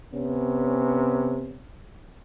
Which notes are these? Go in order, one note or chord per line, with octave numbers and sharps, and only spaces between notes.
C3 B3 C#4